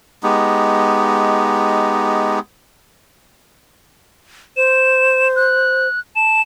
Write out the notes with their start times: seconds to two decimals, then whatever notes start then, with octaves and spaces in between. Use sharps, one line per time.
0.23 G#3 B3 D#4 G4
4.57 C5 E7
5.36 F#6
6.16 A5 E7